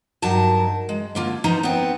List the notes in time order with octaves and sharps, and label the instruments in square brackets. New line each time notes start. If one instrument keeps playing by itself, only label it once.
[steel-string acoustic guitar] G2 F#3 D#4 A#4 A5
G#3
D3 A#3 F4
F3 D#4 F4 B4 C5 A#5
B3 C4